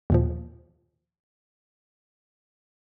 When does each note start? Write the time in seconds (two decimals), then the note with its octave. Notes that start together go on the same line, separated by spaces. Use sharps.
0.10 D#2 A#2 F3